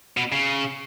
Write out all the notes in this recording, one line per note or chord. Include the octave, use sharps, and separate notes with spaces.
B2
C#3